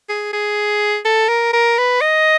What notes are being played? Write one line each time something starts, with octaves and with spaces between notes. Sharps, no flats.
G#4
G#4
A4
A#4
A#4
B4
D#5